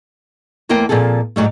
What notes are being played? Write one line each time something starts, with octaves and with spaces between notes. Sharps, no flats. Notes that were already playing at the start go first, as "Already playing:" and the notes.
E2 A3 A#3 A#4 C5 G5
A#2 F3 C4 G#4 A4
G#2 F#3 G3 A3